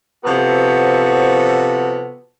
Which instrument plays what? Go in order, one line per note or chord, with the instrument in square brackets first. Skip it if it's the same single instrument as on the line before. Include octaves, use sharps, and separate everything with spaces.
[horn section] C3 F3 B3 F#4 A4